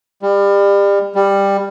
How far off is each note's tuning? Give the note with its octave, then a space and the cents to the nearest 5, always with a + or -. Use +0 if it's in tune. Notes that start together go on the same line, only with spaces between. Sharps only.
G3 +30
G3 +15